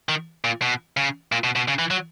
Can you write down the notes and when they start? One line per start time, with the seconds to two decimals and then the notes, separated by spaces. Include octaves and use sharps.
0.09 D#3
0.44 A#2
0.62 B2
0.97 C#3
1.32 A#2
1.44 B2
1.56 B2
1.68 C#3
1.79 E3
1.91 F#3